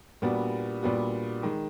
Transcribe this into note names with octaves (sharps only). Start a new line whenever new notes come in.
A#2 G3 B3 D4 F#4
A#2 G3 B3 D4 F#4
D#3 G#3